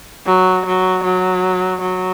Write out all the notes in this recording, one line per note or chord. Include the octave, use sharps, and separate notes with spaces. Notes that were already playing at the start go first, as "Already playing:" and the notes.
F#3
F#3
F#3
F#3